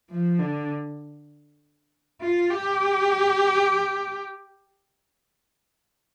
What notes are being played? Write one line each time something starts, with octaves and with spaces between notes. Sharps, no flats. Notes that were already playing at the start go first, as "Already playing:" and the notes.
F3
D3
F4
G4